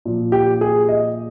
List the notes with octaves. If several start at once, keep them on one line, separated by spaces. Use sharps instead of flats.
A#2 F3
G4
G#4
D#5